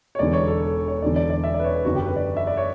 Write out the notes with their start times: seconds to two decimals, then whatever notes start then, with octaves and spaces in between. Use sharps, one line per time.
0.15 C#5
0.19 E1 E2 D3 D5
0.33 C#5
0.47 A4
0.88 C#5
1.02 E1 E2 D3 D5
1.16 D5
1.30 D5
1.44 E5
1.54 D5
1.60 B4
1.65 C#5
1.75 B4
1.85 F#1 F#2 D3 F#4
1.95 G4
2.06 B4
2.16 D5
2.37 E5
2.47 D5
2.57 C#5